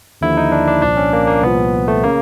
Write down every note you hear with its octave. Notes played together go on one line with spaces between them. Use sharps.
D#2 D3 F3 E4
D#4
D4
D4
C2 A#2 F3 D4
C#4
A#3
A#3
C2 A#2 F3 B3
A3
C#3 A#3